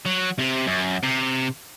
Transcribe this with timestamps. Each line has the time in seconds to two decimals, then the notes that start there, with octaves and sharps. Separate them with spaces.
0.05 F#3
0.39 C3
0.67 F#2
1.03 C3